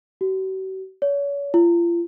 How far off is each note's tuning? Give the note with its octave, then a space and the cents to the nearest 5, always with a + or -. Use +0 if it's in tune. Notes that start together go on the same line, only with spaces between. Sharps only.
F#4 +45
C#5 +35
F4 -35